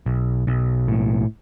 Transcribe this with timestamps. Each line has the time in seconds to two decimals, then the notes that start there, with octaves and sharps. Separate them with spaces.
0.06 B1
0.47 B1
0.88 A2